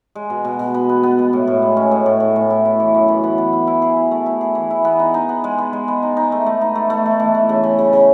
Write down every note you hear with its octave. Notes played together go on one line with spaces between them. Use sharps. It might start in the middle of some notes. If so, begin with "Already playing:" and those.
G#3
B2
B2
B2
B3
B3
B3
B2
A2
A2
G#3
C#4
A2
A2
A2
A2
E4
E4
E3
F#2
E3
B3
B3
E4
E4
G#4
E4
A3
E4
G#4
E3
E4
B3
D#4
D#4
B3
G#3
B3
G#3
B3
D#4
D#4
A3
A3
D#4
A3
A3
A3
E3
A3
C#3
C#3
C#3
C#3